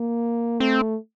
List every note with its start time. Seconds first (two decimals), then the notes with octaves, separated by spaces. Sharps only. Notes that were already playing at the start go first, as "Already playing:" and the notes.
Already playing: A#3
0.60 A3 C4